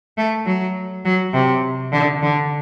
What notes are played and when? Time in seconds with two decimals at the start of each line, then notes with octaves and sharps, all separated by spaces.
0.18 A3
0.46 F#3
1.05 F#3
1.33 C3
1.92 D3
2.22 D3